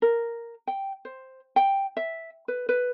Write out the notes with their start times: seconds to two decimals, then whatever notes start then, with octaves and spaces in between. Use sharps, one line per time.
0.02 A#4
0.67 G5
1.05 C5
1.56 G5
1.97 E5
2.48 B4
2.69 B4